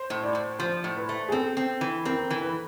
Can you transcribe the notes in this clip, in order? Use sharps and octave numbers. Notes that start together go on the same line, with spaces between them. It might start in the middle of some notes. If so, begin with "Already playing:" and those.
Already playing: C5
A2
D5
A2
F3 C5
A2
B4
A3
G#4
C4 A4
C4
E3
C4 A#4
E3
B4